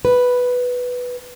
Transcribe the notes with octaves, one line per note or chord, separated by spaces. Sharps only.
B4